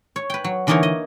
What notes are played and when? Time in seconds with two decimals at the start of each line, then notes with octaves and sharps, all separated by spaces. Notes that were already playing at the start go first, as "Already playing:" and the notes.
0.16 C#5
0.30 B4 G5
0.44 F#3
0.67 D3 E3 A#3 D#4 A#4 C#5
0.83 D#5